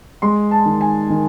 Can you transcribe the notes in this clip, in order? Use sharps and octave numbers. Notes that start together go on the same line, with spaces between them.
G#3 C6
A5
D#3
G#5
D#3